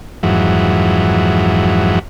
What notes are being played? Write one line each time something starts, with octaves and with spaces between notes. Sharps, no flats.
F2 G#2 E3 F#3